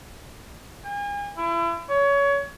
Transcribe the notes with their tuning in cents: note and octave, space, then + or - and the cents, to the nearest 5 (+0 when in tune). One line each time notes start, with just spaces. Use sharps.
G#5 -40
E4 +35
C#5 +25